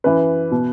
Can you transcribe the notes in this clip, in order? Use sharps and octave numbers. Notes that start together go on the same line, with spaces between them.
F#2 E3 B4
B2